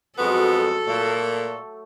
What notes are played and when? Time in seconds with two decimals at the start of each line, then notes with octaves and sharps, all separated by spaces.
0.19 F2 F#3 G#3 B3 A4 C6
0.87 A#2 A3